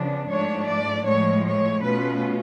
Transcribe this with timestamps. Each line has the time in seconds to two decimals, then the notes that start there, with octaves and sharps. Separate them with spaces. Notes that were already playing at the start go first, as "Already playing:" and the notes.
Already playing: C#3 F3 B3 D4
0.30 G#2 F3 A3 D4 C#5
0.69 D5
1.06 A2 F3 G#3 C#5
1.46 C#5
1.84 B2 A3 C#4 F4 B4